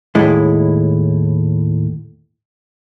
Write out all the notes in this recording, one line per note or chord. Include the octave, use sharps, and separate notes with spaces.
D#2 A2 G#3 E4